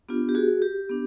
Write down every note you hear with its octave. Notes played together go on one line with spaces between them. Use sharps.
B3 D4 F4 G4
G4
F#4 G#4
G4
B3 D4